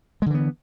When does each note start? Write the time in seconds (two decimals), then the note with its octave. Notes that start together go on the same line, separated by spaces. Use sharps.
0.22 G#3
0.26 D3
0.30 E3
0.34 B3